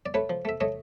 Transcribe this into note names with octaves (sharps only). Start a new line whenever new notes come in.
D5
A3 B4 C#5
F3
A3 E5
A3 C#5 D#5